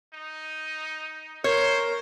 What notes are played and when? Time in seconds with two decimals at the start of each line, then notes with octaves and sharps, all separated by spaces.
0.14 D#4
1.44 A#4 C5 C#5